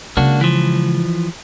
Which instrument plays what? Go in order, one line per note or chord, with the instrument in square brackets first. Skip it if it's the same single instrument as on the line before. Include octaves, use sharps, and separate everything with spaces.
[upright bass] C#3 G#3 [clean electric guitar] A#3 D4 F#4
[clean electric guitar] E3 F3